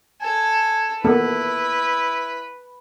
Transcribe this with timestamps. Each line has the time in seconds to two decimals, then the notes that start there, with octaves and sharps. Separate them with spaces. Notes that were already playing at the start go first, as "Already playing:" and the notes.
0.22 A4 G#5
1.04 A#3 B3 E4 A4 B4